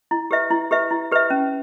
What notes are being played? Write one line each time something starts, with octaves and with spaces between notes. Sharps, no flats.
E4
G4 B4 E5
E4
G4 B4 E5
E4
G4 B4 E5
C#4